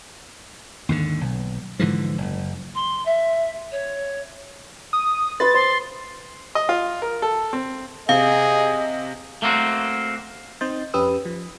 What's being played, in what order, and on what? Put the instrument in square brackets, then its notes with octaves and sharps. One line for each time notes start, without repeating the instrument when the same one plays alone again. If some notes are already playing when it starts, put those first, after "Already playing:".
[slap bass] D#2 G#2 D3
B1
G#2 D3 E3 F3
F#1
[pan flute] C6
E5
C#5
[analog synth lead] D#6
[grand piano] B4 C6 [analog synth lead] A6
[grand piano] C5 [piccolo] C6
[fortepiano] D#5
F4
A#4
A4
C4
[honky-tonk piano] C3 [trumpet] G#4 [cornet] D#5 [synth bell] F5
[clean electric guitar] A3 A#3 C4 F#4
[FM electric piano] C4 D#4 D#5 C6 G6 A6
F2 C#4 G4 B4 D#6 E6
F3